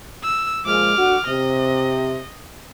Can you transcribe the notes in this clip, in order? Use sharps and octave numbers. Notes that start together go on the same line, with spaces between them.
E6
A#2 F3 G#3 D6 F6
D3 F#4
C3 D#5